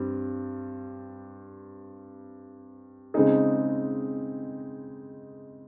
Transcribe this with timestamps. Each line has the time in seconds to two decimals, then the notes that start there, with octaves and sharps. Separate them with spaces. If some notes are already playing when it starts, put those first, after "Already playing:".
Already playing: G2 G3 C4
3.14 C#3 G#3 C4 D#4 G#4